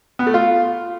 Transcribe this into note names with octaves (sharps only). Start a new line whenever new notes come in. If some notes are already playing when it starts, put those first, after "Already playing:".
B3
A3
F4